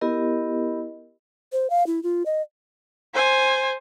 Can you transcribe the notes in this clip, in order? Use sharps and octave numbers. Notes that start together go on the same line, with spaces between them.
B3 E4 G4 A#4 D#5
C5
F5
E4
F4
D#5
C5 G#5